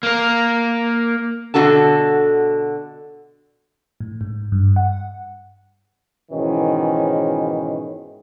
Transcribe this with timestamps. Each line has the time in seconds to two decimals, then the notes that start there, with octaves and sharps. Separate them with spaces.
0.03 A#3 A#4
1.54 B2 D3 F#4 A4 A5
4.00 A2
4.21 G#2
4.52 G2
4.76 F#5
6.31 G#2 B2 D#3 E3 C#4